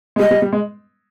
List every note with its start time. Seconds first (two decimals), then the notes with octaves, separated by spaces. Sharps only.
0.16 G#3
0.19 G3 D#5
0.31 G3
0.42 G3
0.53 G#3